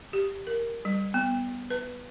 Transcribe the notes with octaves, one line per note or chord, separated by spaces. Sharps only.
G4
A#4
G3
B3
B4